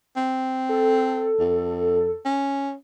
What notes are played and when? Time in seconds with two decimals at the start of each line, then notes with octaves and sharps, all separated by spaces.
0.17 C4
0.69 A4
1.40 F2
2.25 C#4